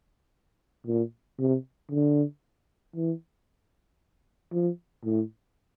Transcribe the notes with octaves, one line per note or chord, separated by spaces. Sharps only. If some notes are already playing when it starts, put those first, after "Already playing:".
A#2
C3
D3
E3
F3
A2